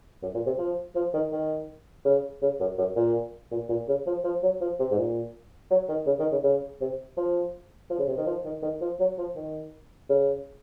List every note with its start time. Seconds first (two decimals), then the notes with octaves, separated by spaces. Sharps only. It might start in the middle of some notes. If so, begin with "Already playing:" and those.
0.22 F#2
0.34 A#2
0.46 C3
0.59 F3
0.95 F3
1.14 D#3
1.32 D#3
2.05 C#3
2.42 C#3
2.60 F#2
2.78 F#2
2.96 A#2
3.51 A#2
3.69 A#2
3.88 C#3
4.07 F3
4.24 F3
4.43 F#3
4.61 F3
4.79 C3
4.91 G#2
4.97 A#2
5.70 F#3
5.88 D#3
6.06 C#3
6.20 D#3
6.32 C#3
6.44 C#3
6.81 C3
7.17 F3
7.90 F3
7.99 C#3
8.08 C3
8.17 D#3
8.26 F3
8.45 D#3
8.62 D#3
8.81 F3
9.00 F#3
9.18 F3
9.36 D#3
10.09 C#3